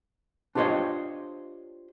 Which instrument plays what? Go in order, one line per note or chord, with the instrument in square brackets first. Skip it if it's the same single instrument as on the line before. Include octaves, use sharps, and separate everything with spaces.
[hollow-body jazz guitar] D4 F4 G4 C5 C#5 D#5